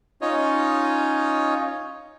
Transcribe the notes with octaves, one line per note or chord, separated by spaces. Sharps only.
C#4 D#4 F4 C#5 D#5